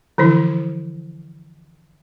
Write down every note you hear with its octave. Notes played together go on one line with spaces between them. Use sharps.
D3 E3 F3 E4